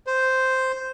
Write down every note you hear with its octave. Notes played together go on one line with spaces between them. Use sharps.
C5